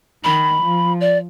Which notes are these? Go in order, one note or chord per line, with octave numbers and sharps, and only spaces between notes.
D#3 B5
F3
D5